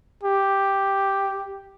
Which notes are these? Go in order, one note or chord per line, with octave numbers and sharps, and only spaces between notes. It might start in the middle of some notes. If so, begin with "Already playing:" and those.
G4